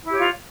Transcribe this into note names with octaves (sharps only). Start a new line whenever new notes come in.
E4 F4 G4 C#5